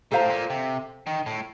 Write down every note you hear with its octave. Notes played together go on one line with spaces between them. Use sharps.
A#2 A4 C5 F5 A#5
A2
A#2
C3
D#3
A2